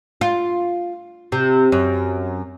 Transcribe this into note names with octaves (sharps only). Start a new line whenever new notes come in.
F4
C3
F#2